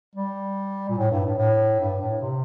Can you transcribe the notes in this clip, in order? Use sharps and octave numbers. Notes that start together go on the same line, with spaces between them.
G3
A#2
A2
G2
A2
A2
G2
A2
C3